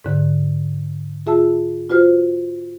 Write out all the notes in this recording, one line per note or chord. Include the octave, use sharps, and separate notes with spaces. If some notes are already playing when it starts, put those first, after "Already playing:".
G#2 D3
F4 G#4 E5 A5 E6
F4 F#4 B4 C5 F6